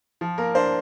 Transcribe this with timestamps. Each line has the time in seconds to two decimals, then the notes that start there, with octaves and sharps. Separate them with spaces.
0.21 F3
0.38 A#3 A#4
0.55 D4 C5